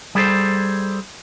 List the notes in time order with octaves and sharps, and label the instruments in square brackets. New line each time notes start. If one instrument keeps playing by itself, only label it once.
[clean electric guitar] G3 G#4 A4 C5